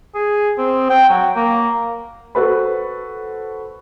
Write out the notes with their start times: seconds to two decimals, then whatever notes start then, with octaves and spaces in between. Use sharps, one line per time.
0.15 G#4
0.58 C4
0.90 G5
1.09 F#3
1.36 A#3
2.35 F#4 A4 B4 C5 B5